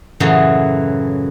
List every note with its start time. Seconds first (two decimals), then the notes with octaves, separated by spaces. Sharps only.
0.20 F#2 A2 C#3 E3 F#3